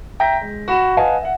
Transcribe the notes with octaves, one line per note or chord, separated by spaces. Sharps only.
E5 G5 A#5 G6 A#6 B6
G#3
F#4 B5 E7
B4 D#5 F5 F#5 G#5 A5
E5 F#5